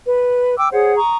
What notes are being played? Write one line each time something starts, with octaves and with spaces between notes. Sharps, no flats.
B4
G5 D6 E6
G#4 C5 C#5 F#5
A#5 C#6 D#6